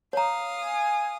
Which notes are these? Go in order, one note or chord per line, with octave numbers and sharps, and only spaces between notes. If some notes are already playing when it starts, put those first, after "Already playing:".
C#5 F5 A#5 D#6
G#5